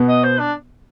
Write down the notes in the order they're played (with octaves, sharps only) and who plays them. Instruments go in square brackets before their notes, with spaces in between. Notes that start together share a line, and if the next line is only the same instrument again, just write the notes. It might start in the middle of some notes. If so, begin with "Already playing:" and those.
Already playing: [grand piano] B2 B3
[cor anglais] D#5
C5
D4